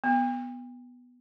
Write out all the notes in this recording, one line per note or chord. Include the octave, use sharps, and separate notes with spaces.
B3